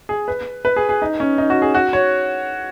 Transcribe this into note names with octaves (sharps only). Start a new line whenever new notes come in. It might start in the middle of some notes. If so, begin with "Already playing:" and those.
G#4
B4
B4
G#4
G#4
D#4
C#4
D#4
F#4
G#4
F#4
C#5